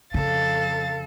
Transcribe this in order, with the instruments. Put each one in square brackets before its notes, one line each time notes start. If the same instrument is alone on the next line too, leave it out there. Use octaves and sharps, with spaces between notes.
[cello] F2 A4 [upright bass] C#3 [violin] F5 A6